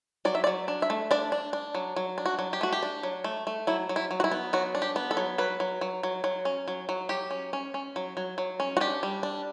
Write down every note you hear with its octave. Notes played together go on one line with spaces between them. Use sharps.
F#3 D5
E5
D5
F#3
D4
E5
A3
D4 D5
D4
D4
F#3
F#3
D4
F#4
F#3
G4
A3 F#4
G4
D4
F#3
A3
A3
F#3 E4
F#3
E4
F#3
F#4
E4
B3
F#3 F#4
D4
G4
B3
A4
F#3
F#3 B4
F#3
F#3
F#3
F#3
C#4
F#3
F#3
F#3 G4
C#4
C#4
C#4
F#3
F#3
F#3
C#4
F#4
D4 G4
G3
D4